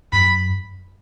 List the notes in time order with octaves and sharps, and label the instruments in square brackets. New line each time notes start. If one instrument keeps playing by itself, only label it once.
[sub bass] F#2 [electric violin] B5